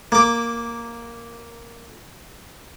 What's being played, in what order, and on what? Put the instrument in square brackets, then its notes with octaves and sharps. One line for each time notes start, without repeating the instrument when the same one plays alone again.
[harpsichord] A#3 D6